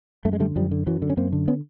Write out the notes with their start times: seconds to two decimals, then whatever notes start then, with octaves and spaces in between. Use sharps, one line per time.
0.25 F#2 A3
0.33 G#3
0.40 D3 G3 A3
0.56 F#2 F3 G3
0.71 D3
0.86 F#2 E3 F#3
1.02 D3
1.10 C#4
1.17 F#2 A#3 C4
1.33 D3
1.48 B3 C#4